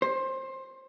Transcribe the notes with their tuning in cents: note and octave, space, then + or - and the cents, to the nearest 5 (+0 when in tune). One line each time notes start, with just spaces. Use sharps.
C5 +20